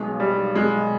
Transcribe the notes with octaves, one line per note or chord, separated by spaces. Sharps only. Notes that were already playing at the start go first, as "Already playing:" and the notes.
Already playing: B1 B2 G#3
G3
G#3